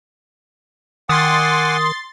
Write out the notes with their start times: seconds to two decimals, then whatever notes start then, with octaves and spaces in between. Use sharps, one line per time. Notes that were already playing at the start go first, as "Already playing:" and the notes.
1.09 D#3 F#5 G#5 C6 D6 D#6 A6